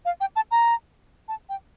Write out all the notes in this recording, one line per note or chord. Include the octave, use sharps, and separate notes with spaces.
F5
G5
A5
A#5
A5
G5